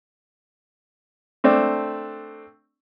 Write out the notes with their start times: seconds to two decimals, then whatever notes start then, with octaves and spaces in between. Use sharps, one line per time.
1.44 A3 C4 D4